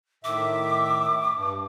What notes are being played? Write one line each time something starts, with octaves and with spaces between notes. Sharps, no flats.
A2 D#3 E5 D6
G2